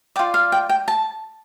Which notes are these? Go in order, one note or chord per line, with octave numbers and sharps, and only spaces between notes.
F4 D5 G5
F5
G5
G5
A5